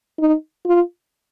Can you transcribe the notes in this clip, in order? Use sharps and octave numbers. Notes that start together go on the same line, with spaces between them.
D#4
F4